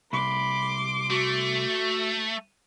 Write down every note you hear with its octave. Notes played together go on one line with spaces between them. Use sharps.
C2 B5 C6 D6
A3 F#4